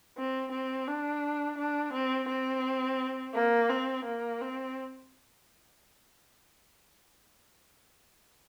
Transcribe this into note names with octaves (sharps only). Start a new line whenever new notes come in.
C4
C4
D4
D4
C4
C4
A#3
C4
A#3
C4